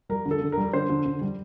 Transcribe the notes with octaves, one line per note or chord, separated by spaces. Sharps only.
G3 A#4
D3
A4
D3
A#4
G3
D3 C5
D3
D3
G3